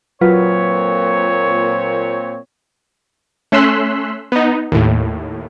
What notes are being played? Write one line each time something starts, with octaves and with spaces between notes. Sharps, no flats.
A#2 F#3 C4 F4 B4 C#5
A3 C#4 C6 E6 F#6 B6
B3 D#4
D#2 A2